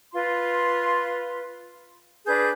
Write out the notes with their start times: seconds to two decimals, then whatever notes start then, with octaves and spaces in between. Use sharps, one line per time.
0.12 F4 B4 C6
2.26 D4 G#4 B4 G6